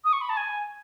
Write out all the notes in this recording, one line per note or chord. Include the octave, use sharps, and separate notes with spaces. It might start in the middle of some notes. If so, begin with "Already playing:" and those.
D#6
C#6
B5
A5
G#5